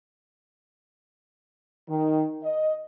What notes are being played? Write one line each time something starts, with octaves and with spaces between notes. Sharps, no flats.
D#3
D#5